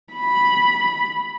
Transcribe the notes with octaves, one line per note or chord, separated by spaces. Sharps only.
B5